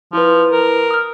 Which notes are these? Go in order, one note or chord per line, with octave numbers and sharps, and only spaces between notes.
F3 E4 B4
A#4
D#6 F6